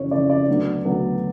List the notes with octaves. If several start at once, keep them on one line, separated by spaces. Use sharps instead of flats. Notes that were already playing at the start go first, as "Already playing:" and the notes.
Already playing: F2 C#3 E3 C#5
F2 C#3 E3 D5
D5
D2 D3 F#3 B3
D2 D3 F#3 B3